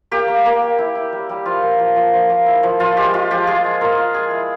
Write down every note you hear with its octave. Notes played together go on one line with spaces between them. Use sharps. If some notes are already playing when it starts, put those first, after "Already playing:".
A#3 G4
A#3
A#3
A#3
E4
E4
G3
G3
F3 F4
A#3
F3
F3
F3
A#3
E4
F3
F3 F4
G#3 G4
G#3 F4
F3 G4
F4 G#4
G#3
F4 A#4
F4
G#3 G#4
E4